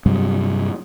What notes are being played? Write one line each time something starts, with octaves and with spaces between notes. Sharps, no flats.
G2 C3 F#3 G3